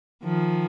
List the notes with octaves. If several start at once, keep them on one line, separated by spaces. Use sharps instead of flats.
D#3 F3